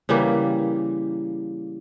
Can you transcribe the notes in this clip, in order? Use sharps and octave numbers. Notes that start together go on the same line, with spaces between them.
C#3 E3 G3 A#3